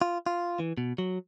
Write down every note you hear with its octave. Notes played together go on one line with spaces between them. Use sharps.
F4
F4
E3
B2
F#3